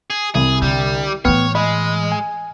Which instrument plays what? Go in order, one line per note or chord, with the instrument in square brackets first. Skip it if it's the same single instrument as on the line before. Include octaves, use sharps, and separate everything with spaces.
[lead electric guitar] G#4
[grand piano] C2 [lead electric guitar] G#4
[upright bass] D3 [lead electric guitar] G3
[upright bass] A2 E3 [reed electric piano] B3 [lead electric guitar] C#5 [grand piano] G5 F6
[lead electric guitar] G#3 [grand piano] D#5 [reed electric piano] B5
[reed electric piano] G#5